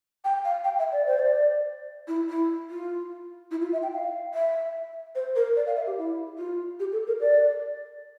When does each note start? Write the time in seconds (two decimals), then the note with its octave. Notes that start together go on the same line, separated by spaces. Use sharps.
0.24 G5
0.45 F5
0.64 G5
0.79 E5
0.92 D5
1.06 C5
1.19 D5
2.08 E4
2.29 E4
2.70 F4
3.51 E4
3.62 F4
3.73 E5
3.83 G5
3.93 F5
4.34 E5
5.15 C5
5.36 A#4
5.56 D5
5.67 F5
5.76 E5
5.87 G4
5.98 E4
6.38 F4
6.80 G4
6.93 A4
7.07 A#4
7.21 D5